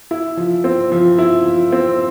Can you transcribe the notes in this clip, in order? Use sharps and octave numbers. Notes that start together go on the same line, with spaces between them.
E4
F3
C4
F3
E4
F3
C4